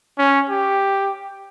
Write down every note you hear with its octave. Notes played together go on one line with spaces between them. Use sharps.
C#4
G4